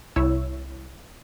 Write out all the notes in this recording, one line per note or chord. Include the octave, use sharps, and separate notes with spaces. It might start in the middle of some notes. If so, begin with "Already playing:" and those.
C2 E4 C#5 E6